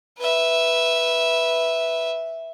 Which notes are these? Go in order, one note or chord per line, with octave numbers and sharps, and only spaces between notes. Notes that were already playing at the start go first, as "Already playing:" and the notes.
B4 E5